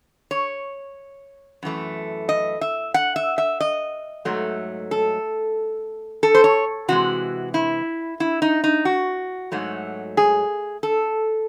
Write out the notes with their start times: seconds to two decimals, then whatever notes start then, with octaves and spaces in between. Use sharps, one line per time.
0.31 C#5
1.63 F#2 E3 A3
2.29 D#5
2.61 E5
2.94 F#5
3.16 E5
3.38 E5
3.60 D#5
4.25 G#2 F#3 A3
4.91 A4
6.23 A4
6.35 C5
6.44 C#5
6.88 C3 E3 G#3 F#4
7.54 E4
8.20 E4
8.42 D#4
8.64 D#4
8.85 F#4
9.52 G#2 F#3 A3
10.17 G#4
10.83 A4